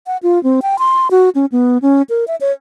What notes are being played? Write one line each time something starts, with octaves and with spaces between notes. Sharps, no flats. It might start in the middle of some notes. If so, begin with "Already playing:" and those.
F#5
F4
C4
G5
C6
F#4
C#4
B3
C#4
A#4
E5
C#5